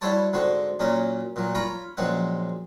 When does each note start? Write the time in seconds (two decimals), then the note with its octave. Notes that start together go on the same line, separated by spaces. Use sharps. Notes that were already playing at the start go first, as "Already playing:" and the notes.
0.01 G3 E4 F#4 C5 C#5 A5
0.33 G#2 D3 C4 F#4
0.79 F#2 A#2 F#3 C#4 A#4
1.36 A#2 F#3
1.55 F4 C#5 A#5 B5
1.97 A#1 F#2 G#3 C4 F#5